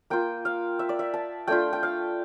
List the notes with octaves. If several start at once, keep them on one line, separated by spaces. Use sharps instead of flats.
A#3 F4 G5
F5
E5
D5
E5
A5
A3 D4 F4 G5
G5
F5